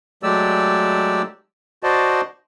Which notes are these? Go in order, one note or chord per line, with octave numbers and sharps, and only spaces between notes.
F#3 G#3 A3 G4 D5 E6
F#4 C5 D5 D#5 A5